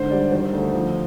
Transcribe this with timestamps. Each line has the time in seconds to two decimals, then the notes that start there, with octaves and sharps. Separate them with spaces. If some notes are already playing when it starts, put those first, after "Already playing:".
Already playing: G#2 D3 C5
0.11 G3 D5
0.32 D#3 C5
0.53 D2
0.74 F3